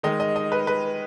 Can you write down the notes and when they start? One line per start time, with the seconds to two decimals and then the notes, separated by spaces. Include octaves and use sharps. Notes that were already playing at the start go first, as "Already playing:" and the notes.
0.03 D#3 G#3 D#4 D#5
0.20 D#5
0.36 D#5
0.52 B4
0.67 B4